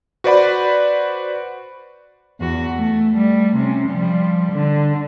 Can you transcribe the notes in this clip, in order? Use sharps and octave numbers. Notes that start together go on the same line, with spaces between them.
F#4 B4 C5 D5 F#5 B5
E2 F#4
A3
G3 A3
C3 C#4
F3 G3
D3